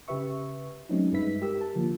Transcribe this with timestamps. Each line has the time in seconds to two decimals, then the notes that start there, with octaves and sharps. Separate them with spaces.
0.08 C#3 G4 B4 E5 C#6
0.89 F#3 G#3 A3 C4 C#4 D#4
1.12 G2 G#3 D#4 B4 E5 B6
1.42 G4 A#4 E6
1.61 A5
1.76 D3 F3 A#3